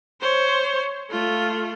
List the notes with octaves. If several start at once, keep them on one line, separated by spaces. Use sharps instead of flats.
C5 C#5
A3 F4